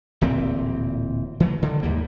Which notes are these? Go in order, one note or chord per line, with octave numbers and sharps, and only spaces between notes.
D1 A#2 E3 C4
E3 F#3 A3
D3 D#3
D#2 G#2 G3 A#3